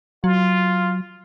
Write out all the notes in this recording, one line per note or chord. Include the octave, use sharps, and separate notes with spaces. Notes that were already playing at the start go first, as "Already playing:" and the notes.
F#3 F4